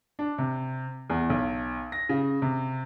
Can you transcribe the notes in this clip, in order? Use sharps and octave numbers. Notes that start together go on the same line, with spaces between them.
D4
C3
E2
B1
A#6
C#3
C3